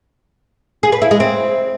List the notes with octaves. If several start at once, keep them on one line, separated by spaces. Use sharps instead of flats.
G#4
B4
E4
G#3
C4